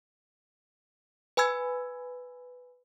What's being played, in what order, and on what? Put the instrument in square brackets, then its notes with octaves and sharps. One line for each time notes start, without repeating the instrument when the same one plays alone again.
[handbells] B4 G#5 B5 E6 G#6